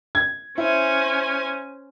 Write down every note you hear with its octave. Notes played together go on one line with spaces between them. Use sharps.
G#6
C#4 E4 C5 G#5